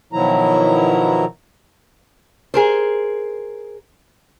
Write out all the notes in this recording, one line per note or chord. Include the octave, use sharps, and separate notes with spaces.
B2 D#3 F3 F#3 E4 A#5
G#4 A#4 C5